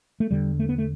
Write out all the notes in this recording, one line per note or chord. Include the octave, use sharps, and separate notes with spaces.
A3
E2 D3 G3
A3
B3
A3